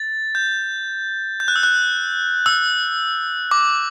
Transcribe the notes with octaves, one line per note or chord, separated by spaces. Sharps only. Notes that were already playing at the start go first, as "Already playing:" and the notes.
Already playing: A6
G6
G6
F#6
E6
F#6
E6
D6